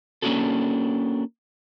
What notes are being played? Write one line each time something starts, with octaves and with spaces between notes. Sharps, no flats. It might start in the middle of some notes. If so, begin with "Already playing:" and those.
A#3 C#4 D4 F4 F#4 A4